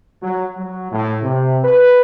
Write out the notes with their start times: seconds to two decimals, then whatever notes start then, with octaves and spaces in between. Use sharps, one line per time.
0.23 F#3
0.57 F#3
0.91 A2
1.23 C3
1.63 B4